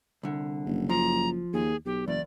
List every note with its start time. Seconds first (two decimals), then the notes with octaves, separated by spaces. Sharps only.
0.23 C2 D3
0.66 F#1
0.89 F3 A#5
1.53 D#2 G#4
1.86 B1 G4
2.08 F#1 E2 D5